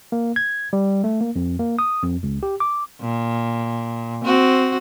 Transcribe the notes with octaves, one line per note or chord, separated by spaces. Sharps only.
A#3
G#6
G3
A3
A#3
F2
A#3
D#6
F2
C#2
G4
D6
A#2
C4 F#4